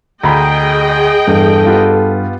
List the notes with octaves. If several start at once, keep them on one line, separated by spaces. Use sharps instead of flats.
D2 G#4 D#5 G5 A#5 B5
E2 G2 A4
B3 F4 G4